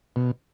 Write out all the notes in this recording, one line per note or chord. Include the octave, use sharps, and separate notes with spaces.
B2